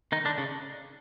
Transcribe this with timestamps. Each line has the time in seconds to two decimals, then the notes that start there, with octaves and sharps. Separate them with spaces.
0.12 D#3 D#4
0.25 D3 D4
0.38 C#3